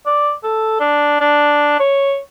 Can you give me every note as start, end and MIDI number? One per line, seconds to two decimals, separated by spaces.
0.06 0.33 74
0.44 0.77 69
0.80 1.20 62
1.21 1.78 62
1.80 2.19 73